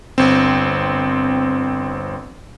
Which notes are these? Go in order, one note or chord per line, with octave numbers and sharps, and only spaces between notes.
G1 C4